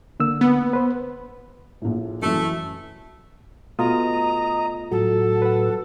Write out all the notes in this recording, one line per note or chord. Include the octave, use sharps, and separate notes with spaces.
D3 A#3 E6
B3
B4 C5
A#1 A2
F#2 E3 F#3 A3
B2 A3 F4 D#5 A#5 D#6
A2 F#3 F#4 A4
B4 F#5